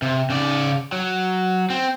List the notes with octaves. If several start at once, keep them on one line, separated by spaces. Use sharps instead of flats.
C3
C#3 D5
F#3
C4